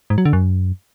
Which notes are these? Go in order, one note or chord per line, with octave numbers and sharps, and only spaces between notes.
G#2
F#3
D3
F#2